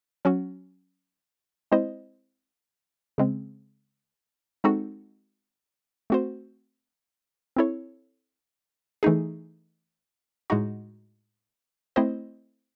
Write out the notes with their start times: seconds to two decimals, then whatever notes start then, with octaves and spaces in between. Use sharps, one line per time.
0.25 F#3 C#4 F#4
1.72 G#3 C4 E4 C5 D#5
3.18 C#3 G#3 C4
4.64 G#3 C4 D#4 F#4 A4
6.10 A3 C4 F#4 C5
7.56 C4 E4 A4 C#5
9.03 E3 A3 D#4 G#4
10.50 A2 G#3 D#4 F#4
11.96 A3 C4 E4 C5 D#5